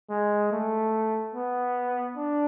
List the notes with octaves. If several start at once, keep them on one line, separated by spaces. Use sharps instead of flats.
G#3
A3
B3
D4